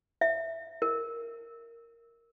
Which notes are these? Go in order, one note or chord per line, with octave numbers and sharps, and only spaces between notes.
E5
A#4